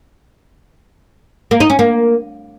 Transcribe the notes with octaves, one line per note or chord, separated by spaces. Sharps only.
A#3
D#4
C#4
A#3